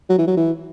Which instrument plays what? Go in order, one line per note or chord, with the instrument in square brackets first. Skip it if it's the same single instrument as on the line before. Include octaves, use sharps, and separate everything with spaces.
[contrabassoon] F#3
E3
F#3
E3